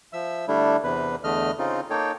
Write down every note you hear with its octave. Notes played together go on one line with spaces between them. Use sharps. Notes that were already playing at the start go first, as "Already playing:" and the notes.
F3 E5 E6
D3 G3 A3 D4 E4
E2 C3 B4
E2 D3 A3 D#5 F6
C#3 C4 D#4 F4
A#3 D#4 A4 C#5 G5